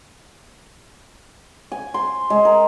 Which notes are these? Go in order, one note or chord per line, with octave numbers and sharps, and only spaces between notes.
G#5
C6
G#3
A#4